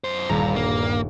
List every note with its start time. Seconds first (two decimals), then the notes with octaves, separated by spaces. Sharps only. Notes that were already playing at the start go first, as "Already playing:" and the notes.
0.04 F#2 C5
0.29 D#1 G2 A#5
0.56 G2 A#3